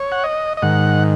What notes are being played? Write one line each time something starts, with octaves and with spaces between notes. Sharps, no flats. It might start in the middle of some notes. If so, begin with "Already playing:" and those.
Already playing: C#5
F#5
D#5
D#5
G#2 D#3 F#5